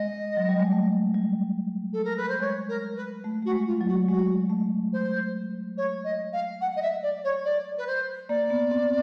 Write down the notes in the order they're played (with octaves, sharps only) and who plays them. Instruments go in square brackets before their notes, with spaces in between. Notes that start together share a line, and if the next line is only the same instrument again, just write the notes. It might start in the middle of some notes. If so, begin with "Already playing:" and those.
Already playing: [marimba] G#3 [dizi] D#5
[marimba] F#3
G3
G#3
A3
G3
[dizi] A4
A#4
B4
C5
[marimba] G#3 [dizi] C#5
[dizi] A#4
B4
[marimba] A3
[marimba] A3 [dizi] F#4
[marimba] G#3
[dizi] F4
[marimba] F#3
[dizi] F#4
[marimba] G#3 [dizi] F#4
[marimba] A3
[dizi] C5
C#5
D#5
F5
F#5
D#5
E5
D5
C#5
D5
B4
C5
[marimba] A#3 [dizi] D5
[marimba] B3
C4